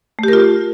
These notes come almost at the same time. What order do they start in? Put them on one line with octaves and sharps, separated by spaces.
A3 G4 A#4 F4